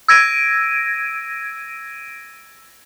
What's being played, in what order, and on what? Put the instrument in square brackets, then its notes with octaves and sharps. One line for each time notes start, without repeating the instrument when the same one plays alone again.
[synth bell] E6 G#6 A#6 D7 D#7